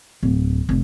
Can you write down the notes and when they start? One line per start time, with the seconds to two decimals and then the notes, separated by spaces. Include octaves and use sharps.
0.23 D1
0.69 F1